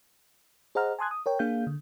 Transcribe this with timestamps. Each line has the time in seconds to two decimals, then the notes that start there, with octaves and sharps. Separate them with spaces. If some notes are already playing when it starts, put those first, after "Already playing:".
0.75 G#4 C5 D#5 F#5 A#5 F6
0.99 G#5 A5 C6 D#6 F#6 G#6
1.11 D#6
1.26 A#4 C#5 G5
1.39 A#3 D4 G#4 F5 G6
1.67 D3